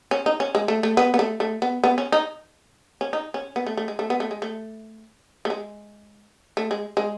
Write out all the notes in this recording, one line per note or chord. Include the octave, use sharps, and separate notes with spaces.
C#4
D#4
C#4
G#3
A3
A3
B3
B3
A3
A3
B3
B3
C#4
D#4
C#4
D#4
C#4
B3
A3
A3
G#3
A3
B3
A3
G#3
A3
A3
G#3
A3
G#3
G#3